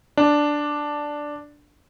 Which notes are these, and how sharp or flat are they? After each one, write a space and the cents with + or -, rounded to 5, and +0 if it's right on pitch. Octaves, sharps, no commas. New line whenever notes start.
D4 +0